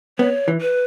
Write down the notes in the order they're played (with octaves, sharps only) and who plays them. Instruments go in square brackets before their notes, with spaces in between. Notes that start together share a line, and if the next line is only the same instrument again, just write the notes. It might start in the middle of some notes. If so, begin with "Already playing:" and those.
[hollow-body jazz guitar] B3 [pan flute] C#5
[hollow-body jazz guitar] E3
[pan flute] B4